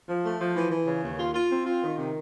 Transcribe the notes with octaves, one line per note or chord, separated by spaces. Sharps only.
F3
A3
F3
E3
E3
C#3
D#2
F4
F4
C4
F4
D#3
C3